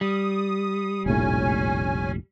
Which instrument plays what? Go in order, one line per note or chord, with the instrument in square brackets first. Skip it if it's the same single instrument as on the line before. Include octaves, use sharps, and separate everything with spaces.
[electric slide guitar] G3 [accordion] D#6
[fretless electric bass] F1 A#1 A2 [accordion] C#4 G#5